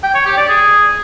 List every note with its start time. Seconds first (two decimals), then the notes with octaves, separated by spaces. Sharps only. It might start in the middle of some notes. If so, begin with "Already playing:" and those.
0.03 G5
0.14 C#5
0.26 G4
0.37 D5
0.48 G#4